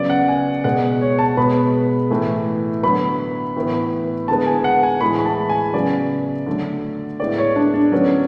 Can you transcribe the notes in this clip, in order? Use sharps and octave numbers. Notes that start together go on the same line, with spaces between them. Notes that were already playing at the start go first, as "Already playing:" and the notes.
Already playing: C#3 F#3 B3 D5
F#5
G#5
B2 G#3 B3 F#5
C#5
A5
B2 G#3 B3 B5
A2 E3 A3
D3 F#3 B3 B5
A2 E3 B3
D3 G#3 B3 A5
G#5
F#5
G#5
A2 E3 G#3 B5
B5
A5
G#5
C#3 F#3 B3 D5
D3 F#3 A3
A2 G#3 B3 D5
C#5
D4
D4
D3 F#3 B3 C#4